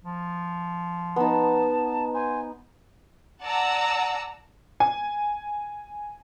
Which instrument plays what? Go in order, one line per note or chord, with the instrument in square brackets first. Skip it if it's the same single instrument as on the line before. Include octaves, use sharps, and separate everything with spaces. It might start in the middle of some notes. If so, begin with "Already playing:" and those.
[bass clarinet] F3
[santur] B3 D#4 [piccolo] A5
[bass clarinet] C5 [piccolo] G#5
[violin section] D5 F#5 A5 A#5 E6
[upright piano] G#5